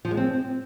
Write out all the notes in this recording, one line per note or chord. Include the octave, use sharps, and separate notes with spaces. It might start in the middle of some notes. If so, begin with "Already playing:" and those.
F3
G#3
C4